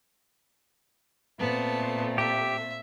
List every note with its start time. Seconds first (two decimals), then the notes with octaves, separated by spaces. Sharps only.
1.39 A#2 A3 B3 C4 A5
2.18 G4 E5